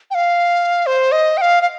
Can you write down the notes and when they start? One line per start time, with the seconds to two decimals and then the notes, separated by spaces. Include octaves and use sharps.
0.11 G5
0.15 F5
0.86 C5
1.12 D#5
1.37 G5
1.41 F5
1.62 F5